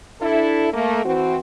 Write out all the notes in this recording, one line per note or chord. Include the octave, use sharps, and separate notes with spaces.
D4 E4 A4
A3 A#3
E3 C4 F#4